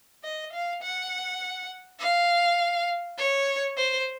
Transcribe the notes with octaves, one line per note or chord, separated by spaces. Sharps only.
D#5
F5
F#5
F5
C#5
C5